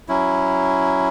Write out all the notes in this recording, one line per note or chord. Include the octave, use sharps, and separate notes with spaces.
F#3 C#4 E4